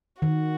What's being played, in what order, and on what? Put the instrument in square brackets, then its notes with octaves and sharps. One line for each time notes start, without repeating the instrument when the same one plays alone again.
[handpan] D#3 [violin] F#4